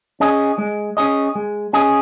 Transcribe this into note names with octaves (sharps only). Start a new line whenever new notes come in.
C#4 G#4 D#5
G#3
C#4 G#4 D#5
G#3
C#4 G#4 D#5